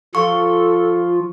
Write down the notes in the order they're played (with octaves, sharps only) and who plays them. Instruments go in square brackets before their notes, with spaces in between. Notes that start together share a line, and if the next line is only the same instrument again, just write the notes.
[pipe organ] F3 [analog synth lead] F4 [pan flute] A4 [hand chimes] C#6